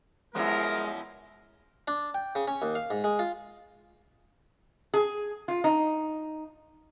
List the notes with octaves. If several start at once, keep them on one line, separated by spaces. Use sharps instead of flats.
F#2 F3 G3 G#3 B3 E4 A#4
D4
G5
C#3
C#4
D#2
F5
G#2
G#3
F4
G#4
F4
D#4